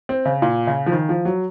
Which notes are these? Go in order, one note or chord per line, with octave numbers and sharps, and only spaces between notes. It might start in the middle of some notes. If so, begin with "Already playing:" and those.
C4
C#3
A#2
C#3
F3
D#3
F3
F#3